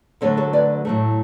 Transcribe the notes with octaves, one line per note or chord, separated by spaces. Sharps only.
D2 D3 F#3 A3 A4 C#5
A4 C#5
B4 D5
A2 F#3 A3